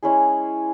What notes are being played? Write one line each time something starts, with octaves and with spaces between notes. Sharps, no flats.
G#3 C#4 E4 G#4